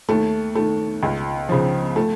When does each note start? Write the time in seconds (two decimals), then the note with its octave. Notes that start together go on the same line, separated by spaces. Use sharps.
0.09 D#2 A3
0.55 D#3 A3
1.03 C#2
1.49 C#3 F3
1.96 A3